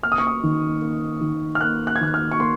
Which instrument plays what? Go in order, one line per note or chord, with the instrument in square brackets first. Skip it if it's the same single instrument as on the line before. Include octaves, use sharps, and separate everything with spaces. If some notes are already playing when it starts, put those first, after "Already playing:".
[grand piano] A#3 F6
D#6
C#6
D#6
D#3
A#3
D#3
F6
A#3 F#6
F#6
G#6
D#3 F#6
F6
C#6
A#3 C6